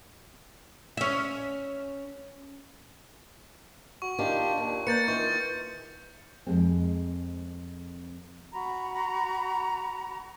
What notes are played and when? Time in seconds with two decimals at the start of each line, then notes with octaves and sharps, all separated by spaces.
0.97 C#4 E5
4.02 F#4 C#6
4.19 D#3 D4 F4 G4
4.58 D#2 A#2
4.87 A#3 B4 G6 A6 C#7
5.08 D#3 E3 F4 C#6
6.47 F2 G#3 C4
8.52 F#4 A#5 B5